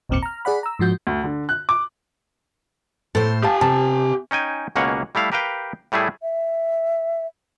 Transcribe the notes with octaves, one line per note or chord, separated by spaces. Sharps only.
G#1 D#2 A#2 C4 D6 C#7
A#5 F6
G#4 D5 F#5 B5
A#5 E6
G#2 F3 F#4 G6
D2
D3
F#6
D6
A2 A4 C5
G4 F5 G#5 A5
C3 A5
C#4 D#4 G5 G#5
C#2 B2 A#3 C#4 C#5 F#5
G3 A3 E4 F5
G4 A#4 B4 F5 G5
A2 G3 A3 E4 G#4
E5